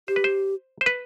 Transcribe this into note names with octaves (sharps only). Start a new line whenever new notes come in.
G4 C5
B4
C5
C5
B4